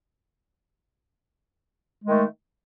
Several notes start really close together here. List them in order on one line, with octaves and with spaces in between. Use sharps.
G#3 D#3 A3